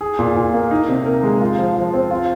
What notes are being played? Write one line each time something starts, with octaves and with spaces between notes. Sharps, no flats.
G#4
A#2
A#2
A#3
D#4
C3
A#4
G#3
F4
F3
F3
C4
F4